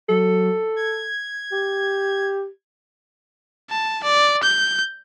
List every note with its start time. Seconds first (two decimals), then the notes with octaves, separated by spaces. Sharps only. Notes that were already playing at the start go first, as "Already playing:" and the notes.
0.09 F#3 A4
0.76 G#6
1.52 G4
3.70 A5
4.04 D5
4.43 G6